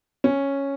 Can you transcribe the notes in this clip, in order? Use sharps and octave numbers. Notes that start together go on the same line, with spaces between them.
C#4